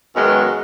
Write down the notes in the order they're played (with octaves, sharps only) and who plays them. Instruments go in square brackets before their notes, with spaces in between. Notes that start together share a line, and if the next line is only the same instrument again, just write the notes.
[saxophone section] F#2 D#3 G#3 B3